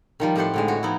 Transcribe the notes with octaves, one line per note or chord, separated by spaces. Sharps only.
D#3 F3 G3
A2 C4 G4 C5 F#5 C6
A2 D3 G#3
F#4 C#5
F3 B3 D#4 E4